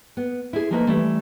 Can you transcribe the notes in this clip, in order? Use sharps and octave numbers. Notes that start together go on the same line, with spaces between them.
B3
E4 G#4
F3 A3 A#3 D#4 B4
E3 G3 A3